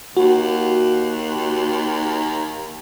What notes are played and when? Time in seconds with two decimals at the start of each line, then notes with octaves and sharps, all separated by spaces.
0.17 D#2 F#4